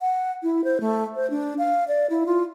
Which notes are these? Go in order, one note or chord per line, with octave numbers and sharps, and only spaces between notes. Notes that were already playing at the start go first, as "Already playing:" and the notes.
F#5
E4
C5
A3
C5
D4
F5
D5
E4
F4